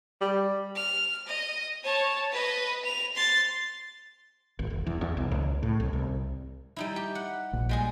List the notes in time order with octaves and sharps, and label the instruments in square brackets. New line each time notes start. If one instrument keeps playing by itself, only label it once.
[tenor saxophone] G3
[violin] F6
D#5
C#5 A5
B4 D#5
F7
C6 A6
[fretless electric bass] G#1
E1
E2
E2
B1
C#2
A2
C2
C2
[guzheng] G3 D#4 E4
G4
F#5
[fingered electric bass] A#1
[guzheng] G3 G#3 G#4